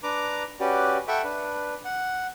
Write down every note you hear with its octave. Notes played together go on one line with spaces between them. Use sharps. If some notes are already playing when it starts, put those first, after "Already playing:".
D4 B4 A#5 D6
C#4 F#4 G4 B4 D5
A4 E5 F#5 G5 B5 C#6
D4 B4
F#5